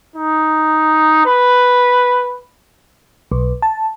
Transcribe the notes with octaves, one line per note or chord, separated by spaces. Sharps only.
D#4
B4
B1
A5